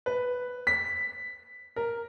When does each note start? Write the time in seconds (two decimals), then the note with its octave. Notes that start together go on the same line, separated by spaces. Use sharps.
0.06 B4
0.67 B6
1.76 A#4